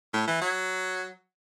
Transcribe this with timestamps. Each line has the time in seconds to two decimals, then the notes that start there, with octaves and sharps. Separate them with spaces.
0.14 A2
0.28 E3
0.41 F#3